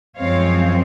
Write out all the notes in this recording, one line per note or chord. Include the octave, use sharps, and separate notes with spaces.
F#2 F3 G#3 C4 C#5 F5